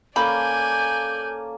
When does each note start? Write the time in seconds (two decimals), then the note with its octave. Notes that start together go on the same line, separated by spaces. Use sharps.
0.16 A#3 C#4 A4 D5 G#5 B5 G6